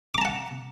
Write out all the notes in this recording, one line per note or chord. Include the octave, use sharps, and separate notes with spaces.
F#5 A5 A#5 D6